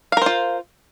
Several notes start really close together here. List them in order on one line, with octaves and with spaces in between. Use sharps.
F5 A#4 C5 F4